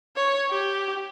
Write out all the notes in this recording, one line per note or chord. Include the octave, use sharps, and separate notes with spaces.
C#5
G4